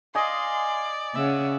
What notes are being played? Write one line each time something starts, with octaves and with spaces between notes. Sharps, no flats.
D5 D#5 F5 G#5 C6
C#3 C#4 E5 F#5